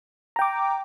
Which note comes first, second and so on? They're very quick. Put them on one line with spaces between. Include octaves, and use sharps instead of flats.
A#5 G5 D6